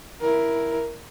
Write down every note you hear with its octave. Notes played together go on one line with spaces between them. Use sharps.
E4 A#4